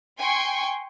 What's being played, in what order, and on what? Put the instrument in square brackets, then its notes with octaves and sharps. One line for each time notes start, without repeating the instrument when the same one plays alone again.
[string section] G5 G#5 C6 C#6